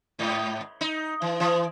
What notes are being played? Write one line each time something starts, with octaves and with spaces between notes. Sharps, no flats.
G#2
D#4
E3
E3